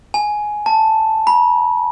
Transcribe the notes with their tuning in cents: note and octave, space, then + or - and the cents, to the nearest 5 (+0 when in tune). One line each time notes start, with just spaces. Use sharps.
G#5 +10
A5 +5
B5 -35